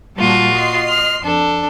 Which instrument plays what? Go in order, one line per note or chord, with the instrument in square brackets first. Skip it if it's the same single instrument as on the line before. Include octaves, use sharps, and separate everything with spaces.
[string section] A#2 G3 A5 [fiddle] F4 F#4
[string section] D#5 C6 C7
[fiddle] F6
[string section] F2 [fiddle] D4 A4